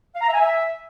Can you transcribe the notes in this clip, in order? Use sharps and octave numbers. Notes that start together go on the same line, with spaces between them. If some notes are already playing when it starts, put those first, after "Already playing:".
F5
A#5
E5
G#5
E5